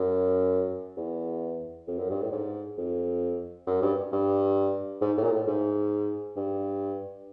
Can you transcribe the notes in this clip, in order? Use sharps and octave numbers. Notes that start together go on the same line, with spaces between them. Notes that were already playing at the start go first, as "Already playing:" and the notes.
Already playing: F#2
E2
F2
F#2
G2
A2
G#2
F2
F#2
G2
G2
G#2
A2
A#2
A2
G#2
G2